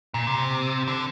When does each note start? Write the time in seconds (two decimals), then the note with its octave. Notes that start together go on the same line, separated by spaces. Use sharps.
0.14 A#2
0.27 C3
0.88 D3